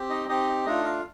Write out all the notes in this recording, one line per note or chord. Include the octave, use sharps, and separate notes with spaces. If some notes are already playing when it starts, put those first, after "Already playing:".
Already playing: C4 G4
D#4 D#5
C4 D#4 G4 D#5
A3 D4 D#4 F4 D#5
F4 F5